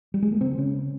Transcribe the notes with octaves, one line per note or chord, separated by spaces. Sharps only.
G3
G#3
A#3
C#3 C4
C#3 C#4